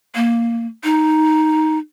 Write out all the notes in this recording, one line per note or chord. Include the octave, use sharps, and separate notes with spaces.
A#3
D#4